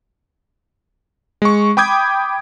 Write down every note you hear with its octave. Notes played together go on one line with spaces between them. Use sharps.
G#3 C#6
G5 B5 D6 D#6 G6 G#6